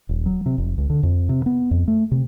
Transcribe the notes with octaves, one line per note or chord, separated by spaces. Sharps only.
D#1
F#3
C3
F1
C#2
D3
F2
C3
B3
F2
A3
C3